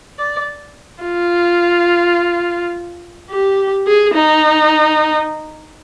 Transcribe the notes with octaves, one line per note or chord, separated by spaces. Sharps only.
D5
F4
G4
G#4
D#4